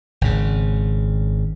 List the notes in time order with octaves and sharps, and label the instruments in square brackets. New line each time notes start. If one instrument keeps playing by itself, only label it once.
[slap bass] G#1 C#3